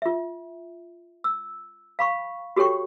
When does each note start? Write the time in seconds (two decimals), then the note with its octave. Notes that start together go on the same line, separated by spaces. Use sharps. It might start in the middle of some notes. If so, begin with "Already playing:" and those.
0.02 F4 E5
1.24 E6
1.99 F5 B5 C#6
2.56 F#4 G4 A4 C#5 G5 C#6